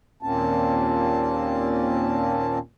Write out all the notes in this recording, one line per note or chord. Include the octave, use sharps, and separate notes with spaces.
D#2 A#2 A#3 C4 C#4 A5